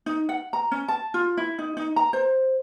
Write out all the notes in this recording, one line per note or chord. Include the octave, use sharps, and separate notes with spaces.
D#4
F#5
A#5
C#4
A5
F4
E4
D#4
D#4
A#5
C5